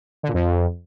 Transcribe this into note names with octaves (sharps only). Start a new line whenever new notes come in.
D3
A#2
F2